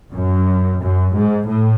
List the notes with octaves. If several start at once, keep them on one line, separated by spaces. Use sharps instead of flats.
F#2
F#2
G#2
A2